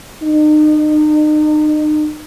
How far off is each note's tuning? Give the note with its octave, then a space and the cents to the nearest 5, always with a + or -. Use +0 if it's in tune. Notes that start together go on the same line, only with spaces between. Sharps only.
D#4 -35